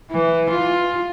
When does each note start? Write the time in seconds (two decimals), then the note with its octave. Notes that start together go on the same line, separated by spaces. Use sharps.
0.11 E3
0.51 F4